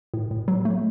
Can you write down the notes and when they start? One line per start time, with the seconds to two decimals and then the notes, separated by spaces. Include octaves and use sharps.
0.14 A2
0.31 A2
0.48 F#3
0.65 A3